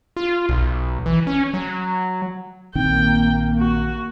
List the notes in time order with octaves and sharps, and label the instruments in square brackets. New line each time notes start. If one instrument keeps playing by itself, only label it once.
[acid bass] F4
B1
E3
C#4
F#3
[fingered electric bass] A#1 D#3 C4 [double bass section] A#3 [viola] G5
[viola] F#4